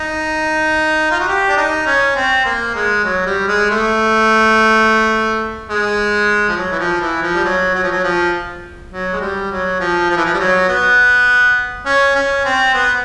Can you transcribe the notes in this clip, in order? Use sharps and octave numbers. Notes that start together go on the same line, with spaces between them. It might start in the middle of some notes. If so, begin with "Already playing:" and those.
Already playing: D#4
F4
F#4
G4
D4
D#4
C#4
C4
A#3
G#3
F#3
G3
G#3
A3
G#3
F3
F#3
E3
F3
E3
F3
G3
F#3
F#3
F3
F#3
F3
F#3
G#3
G3
F#3
F3
F3
E3
F3
G3
F#3
B3
C#4
C#4
C4
B3